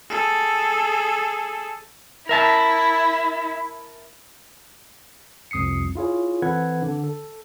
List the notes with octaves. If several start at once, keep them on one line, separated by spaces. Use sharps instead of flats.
G#4 A4
E4 A#4 E5 A5
C2 F2 D#6 C7 C#7
E4 F4 G#4 C#5
E3 C4 A4 B4 F#5 G#6
D3
A4